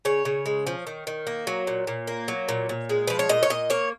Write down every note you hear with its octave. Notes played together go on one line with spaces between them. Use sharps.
C#3 C#5
C#3
G#3
F3
D#3
D#3
A#3
F#3
A#2
A#2
A#3
F#3
A#2
A#2
G#3
F3 B4
C#5
A#2 D#5
C#5
A#2 D#5
A#3 C#5